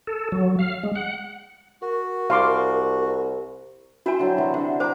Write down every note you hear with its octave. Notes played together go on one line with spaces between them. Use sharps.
A4
F#3
F5
G#3
F#5
F#4 A#4
C2 F5 C6 D6
E4 F#4 C5 G5 G#5
D3 F#3
C3 E3
D3 F#5
C5 F#5 G#5 A#5 D6